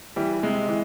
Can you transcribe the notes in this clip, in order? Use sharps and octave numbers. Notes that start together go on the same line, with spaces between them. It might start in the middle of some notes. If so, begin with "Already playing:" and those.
E3 G3
C3 G#3
E3